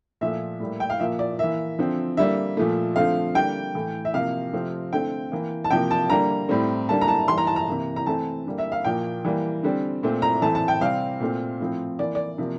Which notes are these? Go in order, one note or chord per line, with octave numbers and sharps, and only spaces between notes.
A#2 F3 A3 E5
A2 G3 A#3
G5
F5
A#2 F3 A#3 E5
D5
E3 A#3 E5
D3 F3 C4
D3 G3 A#3 E5
A#2 F3 A3
D3 F3 A3 C4 F5
D3 G3 A#3 G5
A2 E3 A3
E5
C3 F3 A#3 F5
C3 F3 A3 C4
D3 A3 C4 G5
E3 A#3
A5
C3 F3 A#3 G5
A5
D3 G3 A#3 A#5
A2 G3 C4
D3 G3 A#3 A5
A#5
A5
E3 G3 A#3 C6
A#5
A5
A#5
C3 E3 A#3
A#5
E3 A3 C4 A5
D3 G3 A#3
E5
F5
A#2 F3 A#3 G5
E3 G3 A#3
D3 G3 C4
A#2 A3 C4
A#5
A2 E3 A3 C4 A5
A5
G5
C3 G3 C4 F5
A#2 A3 C4
A2 F3 C4
E3 A#3 D5
D5
C3 F3 A#3